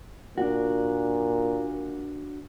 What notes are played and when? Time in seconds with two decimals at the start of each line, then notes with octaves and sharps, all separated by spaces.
0.38 A#2 D4 F#4